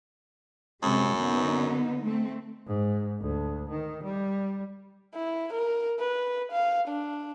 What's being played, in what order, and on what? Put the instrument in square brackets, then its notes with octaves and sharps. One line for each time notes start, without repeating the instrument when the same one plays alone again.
[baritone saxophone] F#2 [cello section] C3 G#3
[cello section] D3 B3 D#4
A3 C4
[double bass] G#2
D2
D#3
G3
[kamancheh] E4
A#4
B4
F5
D4